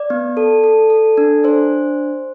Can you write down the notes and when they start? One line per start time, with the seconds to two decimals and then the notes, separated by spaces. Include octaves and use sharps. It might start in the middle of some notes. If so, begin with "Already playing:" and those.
Already playing: D5
0.10 B3
0.37 A4
0.64 A4
0.90 A4
1.17 D4
1.44 D4 C5